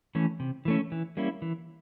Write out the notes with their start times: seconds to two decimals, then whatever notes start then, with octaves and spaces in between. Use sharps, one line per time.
0.15 E3 A3 C#4
0.40 C3
0.65 E3 A3 C#4
0.92 E3
1.17 G3 A#3 C#4 E4
1.42 E3